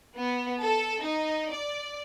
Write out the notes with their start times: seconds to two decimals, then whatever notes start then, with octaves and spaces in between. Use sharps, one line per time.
0.18 B3
0.61 A4
1.03 D#4
1.51 D5